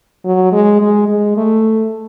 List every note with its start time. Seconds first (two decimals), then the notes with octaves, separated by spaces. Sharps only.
0.25 F#3
0.52 G#3
0.81 G#3
1.08 G#3
1.37 A3